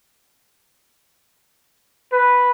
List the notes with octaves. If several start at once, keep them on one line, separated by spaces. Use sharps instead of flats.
B4